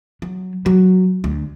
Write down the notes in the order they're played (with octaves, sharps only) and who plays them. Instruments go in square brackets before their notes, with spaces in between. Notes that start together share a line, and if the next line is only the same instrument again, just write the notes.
[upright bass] F#3
F#3
D2